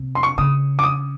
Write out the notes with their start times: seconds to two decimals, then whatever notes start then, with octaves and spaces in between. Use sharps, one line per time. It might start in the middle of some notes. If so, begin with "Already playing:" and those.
Already playing: C3
0.15 C6
0.23 C#6
0.38 C#3 D#6
0.79 D6
0.83 D#6